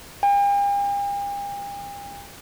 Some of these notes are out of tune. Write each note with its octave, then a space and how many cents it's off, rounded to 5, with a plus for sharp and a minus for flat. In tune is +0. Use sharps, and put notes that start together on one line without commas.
G5 +45